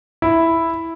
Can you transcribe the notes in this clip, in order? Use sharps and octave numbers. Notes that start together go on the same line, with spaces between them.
E4